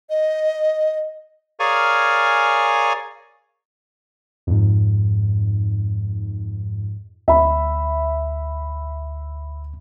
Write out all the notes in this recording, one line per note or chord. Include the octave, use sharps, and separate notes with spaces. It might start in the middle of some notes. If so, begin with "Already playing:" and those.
D#5
G#4 A#4 C#5 D5 F5 G#5
F2 G#2
D2 E5 B5